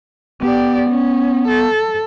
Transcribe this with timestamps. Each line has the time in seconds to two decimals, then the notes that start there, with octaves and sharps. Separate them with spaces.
0.42 B3 G4 D5
0.90 C#4
1.48 A4